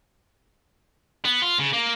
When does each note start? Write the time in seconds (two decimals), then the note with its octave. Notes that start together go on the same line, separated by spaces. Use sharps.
1.25 B3
1.42 F4
1.59 C#3
1.73 A#3